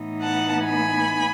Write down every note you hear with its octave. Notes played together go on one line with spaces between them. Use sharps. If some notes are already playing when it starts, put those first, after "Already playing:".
Already playing: A2 E3 B3 D#4
F#5 A5
G#5 B5